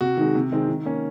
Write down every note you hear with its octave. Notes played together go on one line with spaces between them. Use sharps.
C3 F#4
D#3 G#3
C3
D#3 G#3 C4
D#3
A#3 C#4